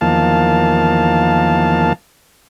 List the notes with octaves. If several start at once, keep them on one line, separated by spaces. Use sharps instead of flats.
E2 D#3 F3 A#3 F5 A5